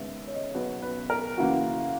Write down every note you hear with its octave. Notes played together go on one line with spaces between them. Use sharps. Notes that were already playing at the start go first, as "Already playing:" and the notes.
Already playing: D#2 C#3 G#3 B3 E5
C#5
D#5
B1 B2 F#3 B3 B4
B4
A#4
F#1 F#2 E3 A#3 F#4